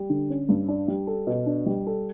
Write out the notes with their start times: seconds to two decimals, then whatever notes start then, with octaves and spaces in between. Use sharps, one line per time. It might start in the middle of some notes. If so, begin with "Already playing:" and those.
Already playing: G3
0.10 D3
0.30 C#4
0.49 G2
0.68 D4
0.88 G3
1.07 A4
1.27 B2
1.46 D4
1.66 G3
1.87 A4